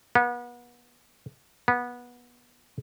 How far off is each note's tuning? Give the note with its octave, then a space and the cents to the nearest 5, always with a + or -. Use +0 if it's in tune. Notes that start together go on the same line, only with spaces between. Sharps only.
B3 -35
B3 -20